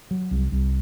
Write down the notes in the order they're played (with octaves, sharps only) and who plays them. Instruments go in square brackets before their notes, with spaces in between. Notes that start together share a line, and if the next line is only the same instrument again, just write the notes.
[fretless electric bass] F#3
C2
C2